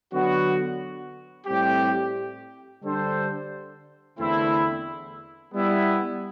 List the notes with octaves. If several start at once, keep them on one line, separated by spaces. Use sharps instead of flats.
D3 F#3 B3 F#4
A2 G3 C4 G4
D3 G3 D4 A4 C5
E2 D3 A3 C4 E4
G3 B3 E4